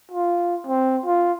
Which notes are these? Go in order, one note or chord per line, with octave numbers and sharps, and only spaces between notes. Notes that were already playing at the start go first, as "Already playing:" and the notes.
F4
C4
F4